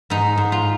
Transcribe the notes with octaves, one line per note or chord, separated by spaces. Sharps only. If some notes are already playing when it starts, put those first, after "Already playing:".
G#2 D#4
G#2
F4